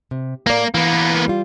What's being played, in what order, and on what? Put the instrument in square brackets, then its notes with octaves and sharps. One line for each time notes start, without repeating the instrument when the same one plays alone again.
[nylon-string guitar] C3
[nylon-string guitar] A2 D5 [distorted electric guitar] A#3
[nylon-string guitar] E3 [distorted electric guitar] A#3 B3
[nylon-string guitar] G3 F4